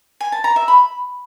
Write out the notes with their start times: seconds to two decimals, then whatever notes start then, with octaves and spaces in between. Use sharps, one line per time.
0.20 G#5
0.32 A5
0.44 A#5
0.56 E5
0.68 B5